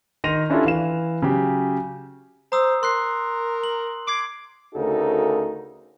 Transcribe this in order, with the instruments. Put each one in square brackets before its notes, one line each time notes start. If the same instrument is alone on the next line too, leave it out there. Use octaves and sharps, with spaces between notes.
[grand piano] D#3 C6 A#6 D#7 F7
C#4 D4 E4 F4 G4 A4
E3 F5 E7
C#3 F#3 G4
[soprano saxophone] C5 [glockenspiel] A#5 D#6 E6
[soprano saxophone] A#4 [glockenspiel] C6 F#6 C7
[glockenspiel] F#7
[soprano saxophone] D6 [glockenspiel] G#6 C7 D7
[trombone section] D2 C#3 D#4 F#4 A4 A#4